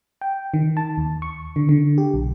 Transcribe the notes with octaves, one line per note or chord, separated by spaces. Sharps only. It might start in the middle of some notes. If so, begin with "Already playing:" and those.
G5
D#3
A5
D#2
C#6
D3
D3
G4
B1